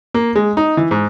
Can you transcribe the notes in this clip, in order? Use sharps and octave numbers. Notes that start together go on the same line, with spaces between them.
A#3
G#3
D#4
E3
G#2